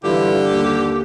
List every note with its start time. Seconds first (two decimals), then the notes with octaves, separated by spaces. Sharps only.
0.04 G2 D3 E3 E4 F4 G4
0.44 D#2